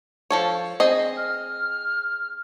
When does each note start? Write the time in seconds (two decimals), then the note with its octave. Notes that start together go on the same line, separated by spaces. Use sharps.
0.31 F3 A4 C#5
0.80 C4 G#4 D#5
1.17 F6